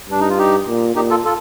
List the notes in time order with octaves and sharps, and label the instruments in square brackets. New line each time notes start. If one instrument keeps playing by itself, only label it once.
[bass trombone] G2 [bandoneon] D4
[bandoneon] D#4
F4
D#4 G4
[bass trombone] A#2
[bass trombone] A#2 [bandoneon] D#4 G4
[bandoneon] F4 A4
F4 A4